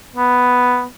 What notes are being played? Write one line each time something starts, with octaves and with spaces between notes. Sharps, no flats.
B3